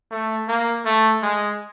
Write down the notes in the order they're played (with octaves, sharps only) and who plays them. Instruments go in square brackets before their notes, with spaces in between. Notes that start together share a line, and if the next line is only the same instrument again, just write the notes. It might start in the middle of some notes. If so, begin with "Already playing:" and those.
[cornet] A3
A#3
A3
G#3